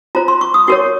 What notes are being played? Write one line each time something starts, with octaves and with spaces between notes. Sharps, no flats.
F4 C5 A#5
C6
C#6
D#6
F#4 A#4 C#5 C#6